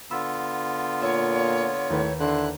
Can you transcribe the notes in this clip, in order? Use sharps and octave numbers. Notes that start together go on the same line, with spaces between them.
D3 B3 F4 B5 E6
A#2 C#5 E5
D#2 A2 B4
D3 E4 C6 F#6